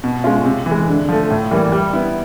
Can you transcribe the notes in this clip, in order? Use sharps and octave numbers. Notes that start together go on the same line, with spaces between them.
B2
G#3 C#4 F4
C3
E3
G#3
D3
F3 A3
A2
E3 G3 A#3
G3
B3 E4